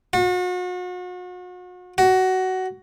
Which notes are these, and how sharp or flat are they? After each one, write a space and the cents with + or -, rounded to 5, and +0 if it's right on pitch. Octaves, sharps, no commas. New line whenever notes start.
F#4 -40
F#4 +15